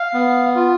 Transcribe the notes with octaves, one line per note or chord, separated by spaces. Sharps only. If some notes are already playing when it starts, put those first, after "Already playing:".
Already playing: F5
B3
F4